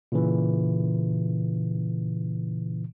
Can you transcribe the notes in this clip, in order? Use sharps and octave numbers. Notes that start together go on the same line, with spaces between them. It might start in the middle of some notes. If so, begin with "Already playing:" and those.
A#2 C#3 E3